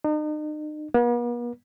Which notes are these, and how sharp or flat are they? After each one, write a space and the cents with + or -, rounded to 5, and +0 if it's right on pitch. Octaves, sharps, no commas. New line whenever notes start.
D#4 -40
B3 -45